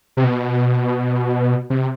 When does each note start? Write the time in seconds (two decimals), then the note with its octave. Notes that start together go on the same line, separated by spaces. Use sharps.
0.17 C3
0.24 B2
1.70 C3